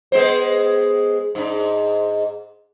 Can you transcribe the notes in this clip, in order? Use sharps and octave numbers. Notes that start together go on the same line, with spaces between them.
G#3 B3 C5
G#2 D4